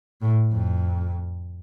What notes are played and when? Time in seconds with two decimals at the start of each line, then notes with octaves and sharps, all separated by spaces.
0.22 A2
0.51 F2